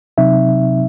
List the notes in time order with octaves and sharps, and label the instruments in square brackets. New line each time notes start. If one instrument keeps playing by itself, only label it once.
[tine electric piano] C3 F#3 C4 D#4 E5